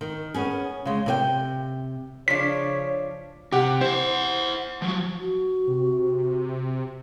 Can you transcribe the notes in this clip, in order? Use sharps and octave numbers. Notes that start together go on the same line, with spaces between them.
D#3
B3 C#4 G#4
C#3 G#3
C3 C5 G5
C#3 F3 D4 C#5 B6
C3 G4 F#5
E4 C5 F#5
F3 F#3
F#4
C3